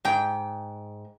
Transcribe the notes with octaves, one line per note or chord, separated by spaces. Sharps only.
G#2 G5